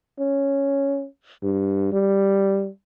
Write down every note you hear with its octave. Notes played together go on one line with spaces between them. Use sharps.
C#4
G2
G3